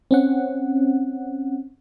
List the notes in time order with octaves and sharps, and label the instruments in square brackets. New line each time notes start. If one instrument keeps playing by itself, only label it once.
[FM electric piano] C4 C#4 F#5